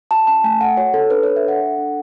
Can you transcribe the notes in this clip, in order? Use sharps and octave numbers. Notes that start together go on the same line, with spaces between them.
F#4 A5
C#4 A5
A3 G#5
A4 F#5
F#4 C#5
C#4 A4
D4 B4
A4 C#5
E5
D4 F#5
A4
D4